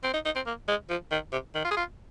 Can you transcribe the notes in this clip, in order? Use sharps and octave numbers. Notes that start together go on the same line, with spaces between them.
C4
D#4
D#4
C4
A#3
G#3
F3
D#3
C3
D#3
F4
G#4
F4